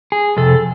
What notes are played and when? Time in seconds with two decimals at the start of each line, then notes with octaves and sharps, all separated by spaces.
0.12 G#4
0.37 F2 C3 A4